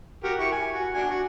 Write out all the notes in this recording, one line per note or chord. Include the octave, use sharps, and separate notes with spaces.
F#4 G4 A#4
E4 G4 C#6
G#5
F#4
D4 F#4 G#5
F#4